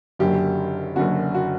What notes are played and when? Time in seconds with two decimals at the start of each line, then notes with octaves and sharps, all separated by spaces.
0.19 F#1 F#2 D3 F#3 G4
0.96 F#1 F#2 D3 F#3 F#4
1.35 F#4